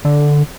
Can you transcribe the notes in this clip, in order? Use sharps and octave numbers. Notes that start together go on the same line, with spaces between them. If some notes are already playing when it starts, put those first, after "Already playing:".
D3